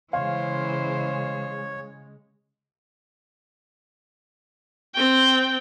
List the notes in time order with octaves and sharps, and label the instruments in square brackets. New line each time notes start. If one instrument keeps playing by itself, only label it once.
[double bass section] C#3 G#3 [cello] E3 C5 [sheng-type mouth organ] C#5 [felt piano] F5 C6
[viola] C4 G5